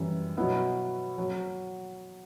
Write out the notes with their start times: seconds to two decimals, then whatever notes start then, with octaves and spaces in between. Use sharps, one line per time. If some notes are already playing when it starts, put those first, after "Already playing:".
Already playing: F#2 E3 G3
0.37 B2 F#3 B3 E4
1.18 F#3